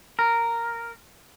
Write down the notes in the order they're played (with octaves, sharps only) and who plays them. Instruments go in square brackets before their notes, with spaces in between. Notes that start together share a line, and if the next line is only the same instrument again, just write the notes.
[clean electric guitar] A#4